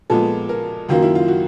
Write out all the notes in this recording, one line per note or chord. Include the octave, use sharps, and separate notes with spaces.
A#2 F3 G#3 B3 A4
A#4
F#2 D#3 F#3 A#3 F4
E4
F4
F#4